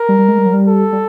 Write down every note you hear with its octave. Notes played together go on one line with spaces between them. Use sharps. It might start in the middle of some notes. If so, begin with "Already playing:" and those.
Already playing: A#4
G3
G3
G#3
G3
F#3
G3
A4
G3